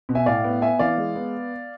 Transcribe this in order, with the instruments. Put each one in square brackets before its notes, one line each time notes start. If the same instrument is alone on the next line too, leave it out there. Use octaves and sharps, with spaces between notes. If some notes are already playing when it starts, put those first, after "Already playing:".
[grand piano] B2
E5 G#5
A2 D5 F5
B3
B3 E5 G#5
E3 D5 F5
G#3
B3